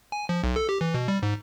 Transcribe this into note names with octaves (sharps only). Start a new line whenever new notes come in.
G#5
F3
B1
A4
G4
E3
B2
G3
G#2